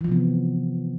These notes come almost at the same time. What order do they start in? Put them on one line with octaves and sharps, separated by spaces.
E3 F3 C3 B3